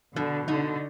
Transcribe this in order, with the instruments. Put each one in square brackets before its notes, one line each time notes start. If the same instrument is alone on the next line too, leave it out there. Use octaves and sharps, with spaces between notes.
[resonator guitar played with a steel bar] B2 [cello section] D3
[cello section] D3 [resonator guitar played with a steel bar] D#4